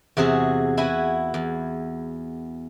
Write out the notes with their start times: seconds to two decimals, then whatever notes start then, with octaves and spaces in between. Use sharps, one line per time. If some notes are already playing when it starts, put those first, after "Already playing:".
0.17 E2 C3 F#4 G#4
0.77 E4 F#4 B4 G#5
1.34 E2